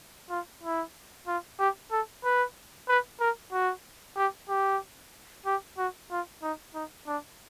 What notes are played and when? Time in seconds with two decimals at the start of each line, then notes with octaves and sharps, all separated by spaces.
0.30 F4
0.63 E4
1.28 F4
1.59 G4
1.91 A4
2.24 B4
2.89 B4
3.21 A#4
3.53 F#4
4.17 G4
4.49 G4
5.46 G4
5.78 F#4
6.11 F4
6.43 D#4
6.74 D#4
7.07 D4